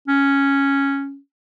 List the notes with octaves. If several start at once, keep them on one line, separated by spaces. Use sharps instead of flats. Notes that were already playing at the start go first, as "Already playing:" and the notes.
C#4